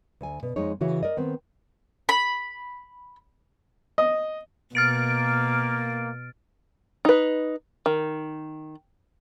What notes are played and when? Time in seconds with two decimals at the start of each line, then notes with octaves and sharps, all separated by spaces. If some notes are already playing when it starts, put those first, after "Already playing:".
0.21 D2 G#5
0.43 B2
0.56 F2 G#3 D#4 C#5
0.81 C#3 E3 F#4 C#5
1.03 A#4 D5 D#5
1.17 D#3 B3 C4
2.09 B5
3.98 D#5
4.75 B2 A#3 F6 A6 D7
7.05 D#4 B4
7.86 D#3